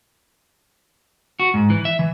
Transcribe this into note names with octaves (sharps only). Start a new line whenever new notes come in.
F#4
G#2
E3
E5
E3